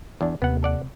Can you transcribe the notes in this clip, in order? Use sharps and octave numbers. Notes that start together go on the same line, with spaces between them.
E2 D4
D#2 C3 B3 F#5
A4 D5 F#5